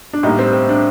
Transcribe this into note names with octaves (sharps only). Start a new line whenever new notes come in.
D4
A2 G3 A#3 D#4
C4
C4
D4